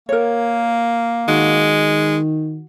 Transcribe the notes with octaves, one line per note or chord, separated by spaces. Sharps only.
A#3 A#4 C#5
D#3 G#3 F#4